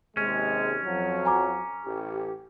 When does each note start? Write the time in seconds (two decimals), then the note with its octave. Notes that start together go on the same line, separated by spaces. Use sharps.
0.17 D#2 C3 G#3 C#4
0.85 F2 F3 F#3
1.25 G#5 A#5 D6
1.86 A1 G4